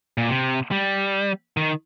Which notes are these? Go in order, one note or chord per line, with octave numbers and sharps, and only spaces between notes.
A#2
C3
G3
D#3